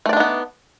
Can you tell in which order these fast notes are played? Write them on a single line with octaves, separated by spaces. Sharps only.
A3 D5 D4 D#4 B3